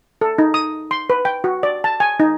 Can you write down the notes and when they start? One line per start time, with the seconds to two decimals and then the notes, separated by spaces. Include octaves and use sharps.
0.21 A4
0.38 D#4
0.54 D#6
0.91 C6
1.10 B4
1.25 G5
1.44 F#4
1.63 D5
1.84 A5
2.00 G#5
2.20 D#4